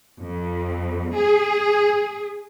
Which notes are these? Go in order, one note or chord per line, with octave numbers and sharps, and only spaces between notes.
F2
G#4